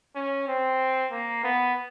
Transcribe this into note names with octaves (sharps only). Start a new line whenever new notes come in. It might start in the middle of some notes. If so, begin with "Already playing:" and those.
C#4
C4
A#3
B3